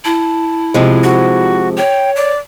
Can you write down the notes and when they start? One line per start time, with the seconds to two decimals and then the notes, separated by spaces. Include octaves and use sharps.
0.05 E4 A5
0.74 C3 F3 G#3
1.03 F#4
1.77 C#5 G5
2.16 D5